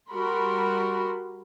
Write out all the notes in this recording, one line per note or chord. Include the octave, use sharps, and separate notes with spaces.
G3 F#4 A#4 B5 C6